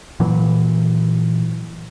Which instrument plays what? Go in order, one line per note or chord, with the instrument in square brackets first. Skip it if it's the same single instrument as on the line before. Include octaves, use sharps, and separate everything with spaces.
[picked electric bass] A#2 E3 F#3